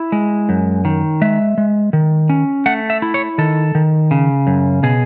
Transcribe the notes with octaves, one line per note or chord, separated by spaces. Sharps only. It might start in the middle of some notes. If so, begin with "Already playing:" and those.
Already playing: E4
G#3
F#2
D#3
G#3 E5
G#3
D#3
C#4
A3 F#5
E5
E4
C#5
D#3 A4
D#3
C#3
F#2
B2 G#4